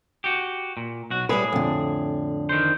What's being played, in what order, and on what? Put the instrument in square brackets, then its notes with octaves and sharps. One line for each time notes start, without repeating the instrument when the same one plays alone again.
[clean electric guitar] F#4 G4
A#2
B1 F#4
[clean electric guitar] A2 G#4 [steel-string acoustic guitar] G3 B4
[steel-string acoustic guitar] F2 D3
[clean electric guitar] D#3 C5